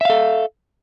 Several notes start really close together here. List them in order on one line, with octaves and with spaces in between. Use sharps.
E5 F5 A4